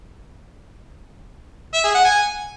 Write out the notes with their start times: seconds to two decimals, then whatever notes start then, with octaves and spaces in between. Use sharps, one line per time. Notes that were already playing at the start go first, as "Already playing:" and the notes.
1.74 E5
1.84 G#4
1.95 F#5
2.05 G#5